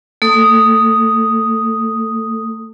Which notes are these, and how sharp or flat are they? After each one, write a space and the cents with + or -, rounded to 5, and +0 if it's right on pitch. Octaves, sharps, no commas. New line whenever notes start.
A3 +35 A4 +0 D#6 +0